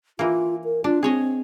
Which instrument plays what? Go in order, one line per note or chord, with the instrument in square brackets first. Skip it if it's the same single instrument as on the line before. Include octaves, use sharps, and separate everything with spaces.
[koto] E3 A#3 [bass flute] F4
[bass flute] A#4
[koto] D4 [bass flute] F4
[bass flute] C4 [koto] G#4 C#5 D#5